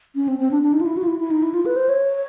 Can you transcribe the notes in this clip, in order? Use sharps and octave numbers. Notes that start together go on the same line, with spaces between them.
C#4
C4
C4
D4
D4
D#4
F4
E4
F#4
F4
E4
E4
D#4
E4
F4
B4
C5
C#5